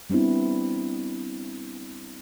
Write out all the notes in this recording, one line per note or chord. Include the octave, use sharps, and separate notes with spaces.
G3 B3 C4 D4 E4